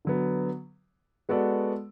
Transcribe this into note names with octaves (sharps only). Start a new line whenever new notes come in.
D3 F#3 B3
G#3 B3 F#4 A4 D5